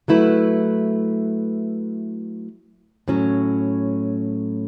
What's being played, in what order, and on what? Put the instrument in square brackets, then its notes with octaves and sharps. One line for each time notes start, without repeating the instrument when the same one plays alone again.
[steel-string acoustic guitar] F#3 A3 E4 B4
A2 F#3 C#4